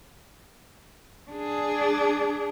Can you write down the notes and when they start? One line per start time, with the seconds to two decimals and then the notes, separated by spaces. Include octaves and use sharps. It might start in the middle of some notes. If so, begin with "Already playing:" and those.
1.31 D4 G#4